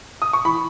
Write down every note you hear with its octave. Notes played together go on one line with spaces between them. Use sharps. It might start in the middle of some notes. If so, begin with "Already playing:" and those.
D#6
C#6
E3 B5